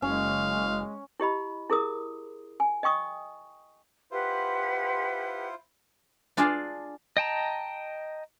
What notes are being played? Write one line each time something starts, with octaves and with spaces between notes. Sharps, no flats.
F#1 G#3 C#4 F5
E4 G4 D#5 B5
E4 G#4 A#4 D#6
G#5
D#5 G5 C#6 D#6
E4 F4 G4 B4 C5 F#5
D4 F4 G#4 D5 F5 A5
D#5 G5 A5 A#5